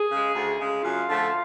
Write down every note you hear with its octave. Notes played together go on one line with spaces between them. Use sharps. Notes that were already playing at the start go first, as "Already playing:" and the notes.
Already playing: G#4
C#3 G#3
D2
C#3 G#3
F#2 F4
D3 F3 A3